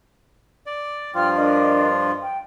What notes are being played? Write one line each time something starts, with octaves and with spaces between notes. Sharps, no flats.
D5
G2 F3 F4 G5 F6
D4 A#4 D#5
G5